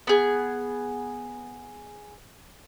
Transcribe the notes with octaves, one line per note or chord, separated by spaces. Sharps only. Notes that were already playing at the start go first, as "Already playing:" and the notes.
B3 G#4